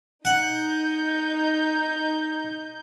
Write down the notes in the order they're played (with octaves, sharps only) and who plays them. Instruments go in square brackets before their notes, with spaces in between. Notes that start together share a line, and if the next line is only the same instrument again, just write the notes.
[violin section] D#4 G6 [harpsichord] F#5